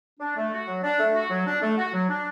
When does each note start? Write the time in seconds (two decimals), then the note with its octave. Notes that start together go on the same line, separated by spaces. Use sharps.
0.20 D4
0.37 A3
0.53 F#4
0.67 F#3
0.84 D4
1.00 A3
1.15 F#4
1.30 F#3
1.46 D4
1.62 A3
1.78 F#4
1.94 F#3
2.09 D4